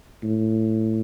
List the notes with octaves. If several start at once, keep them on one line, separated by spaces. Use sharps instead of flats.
A2